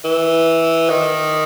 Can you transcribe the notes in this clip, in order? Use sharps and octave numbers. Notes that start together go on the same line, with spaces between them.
E3
D#3